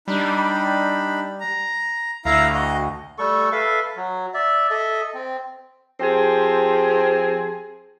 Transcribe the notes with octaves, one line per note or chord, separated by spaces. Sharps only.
G3 D4 D#4 B5
A#5
D2 E4 F5 A#5
F#4 D#5
G3 A3 A4 C#6
A4 B4 E5 F5
F#3
D5 E5
A4 D#5 E5
C4
F3 C4 G4 G#4